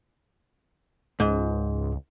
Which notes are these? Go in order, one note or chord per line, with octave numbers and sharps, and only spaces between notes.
C#2 G#2